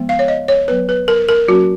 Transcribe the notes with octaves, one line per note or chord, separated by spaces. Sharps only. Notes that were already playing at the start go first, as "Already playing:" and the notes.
Already playing: F3 G#3 B3
F5
C#5
D#5
C#5
F#3 B3 B4
B4
A#4
A#4
F#3 A#3 C#4 F#4